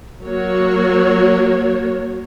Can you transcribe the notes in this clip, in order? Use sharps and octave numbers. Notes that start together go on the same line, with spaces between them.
F#3 A#3 F#4 C#5